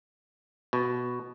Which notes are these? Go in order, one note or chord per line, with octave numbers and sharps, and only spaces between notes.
B2